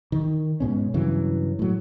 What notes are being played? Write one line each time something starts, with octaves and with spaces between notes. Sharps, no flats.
D#3
G#2 B2 C#4
G2 C#3 E3 F#3
A2 F#3